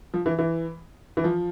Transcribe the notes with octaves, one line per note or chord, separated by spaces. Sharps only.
F3
E3
E3
E3
F3